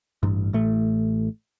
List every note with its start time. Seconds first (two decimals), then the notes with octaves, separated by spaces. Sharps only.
0.23 A1 G2
0.53 A1 A2 A3